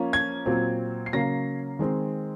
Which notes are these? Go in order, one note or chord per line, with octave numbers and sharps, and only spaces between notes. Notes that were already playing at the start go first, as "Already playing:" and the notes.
Already playing: F3 A#3 C#4
G#6
A#2 F#3 C4
C7
C#3 F#3 A#3 C#4 A#6
D#3 G#3 C4